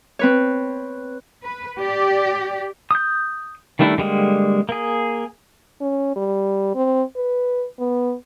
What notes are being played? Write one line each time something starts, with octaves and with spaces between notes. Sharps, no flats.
C4 B4 C#5
B4
G4 D5
D#6 G6
D#3 G3 A3 D4 E4
D3 G3 G#3 A#3
A#3 G#4
C#4
G3
C4
B4
B3